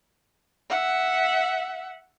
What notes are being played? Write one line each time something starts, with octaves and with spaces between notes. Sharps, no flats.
E5 F#5